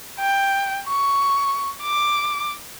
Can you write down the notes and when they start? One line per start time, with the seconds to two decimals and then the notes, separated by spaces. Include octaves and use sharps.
0.20 G5
0.87 C#6
1.83 D6